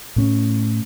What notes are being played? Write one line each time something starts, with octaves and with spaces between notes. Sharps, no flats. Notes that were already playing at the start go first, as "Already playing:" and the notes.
A2 C#4